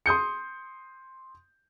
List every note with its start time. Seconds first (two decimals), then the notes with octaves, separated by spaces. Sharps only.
0.06 C6 D#6 G6 C#7